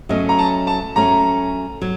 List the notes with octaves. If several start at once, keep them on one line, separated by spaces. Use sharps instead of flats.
F#3 A3 C#4 D#5
A#5
A5
A5
F#3 A3 C#4 A#5
F#3